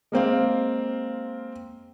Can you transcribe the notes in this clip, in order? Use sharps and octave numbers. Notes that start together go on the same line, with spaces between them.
G#3 A#3 C4 F5